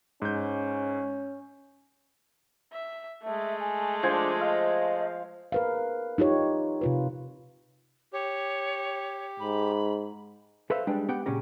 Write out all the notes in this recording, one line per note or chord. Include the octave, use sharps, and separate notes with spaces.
G#2 C#4 G6
E5
G#3 A3 E5
G#5
F3 D4 G#5
D#5 F5
A#4 B4 F5
D#4 F4 G4 C#5
C3 F4 B4
G4 C#5
G#2 B5
A4 B4 C5 E5 F5
G3 G#3 D4 B4 G5
B3 G4 F#5 G5
A#2 C#3 C#4 G4 A#5